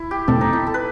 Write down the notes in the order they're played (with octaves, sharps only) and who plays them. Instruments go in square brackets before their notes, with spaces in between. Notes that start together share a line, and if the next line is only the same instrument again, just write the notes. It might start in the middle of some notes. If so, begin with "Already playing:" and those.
Already playing: [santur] E4
G4
[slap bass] E2 B2 A3 C4 [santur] A4
[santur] D#4
E4
A4
B4